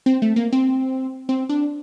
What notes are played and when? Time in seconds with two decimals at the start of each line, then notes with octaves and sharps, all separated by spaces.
0.06 C4
0.22 A3
0.36 A#3
0.52 C4
1.29 C4
1.49 D4